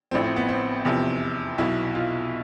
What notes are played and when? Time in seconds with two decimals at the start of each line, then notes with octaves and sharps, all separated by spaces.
0.11 A1 A2 F3 C4
0.24 C4
0.36 B3
0.49 C4
0.85 F1 E2 C3 F3
1.58 B1 B2 E4
1.95 F4